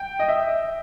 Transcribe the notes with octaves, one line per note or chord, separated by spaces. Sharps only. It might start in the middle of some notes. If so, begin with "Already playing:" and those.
Already playing: G5
D#5
E5